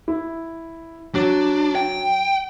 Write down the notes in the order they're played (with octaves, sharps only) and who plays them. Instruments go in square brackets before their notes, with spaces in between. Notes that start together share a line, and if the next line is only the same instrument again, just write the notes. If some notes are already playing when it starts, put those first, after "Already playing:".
[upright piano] E4
[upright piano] F#3 [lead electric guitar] D4
[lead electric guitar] G5